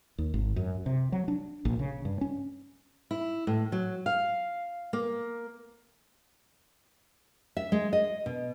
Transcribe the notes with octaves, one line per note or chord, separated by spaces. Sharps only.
D#2
G#1
F#2
C3
F#3
D4
A#1
C#3
G2
C#4
E4
A2
F#3
F5
A#3
E5
G#3
D#5
B2